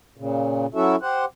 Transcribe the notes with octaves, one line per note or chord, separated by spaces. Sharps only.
A#2 C#3
F#3 C#4 E4 F#4 A4 E5
G4 C5 F#5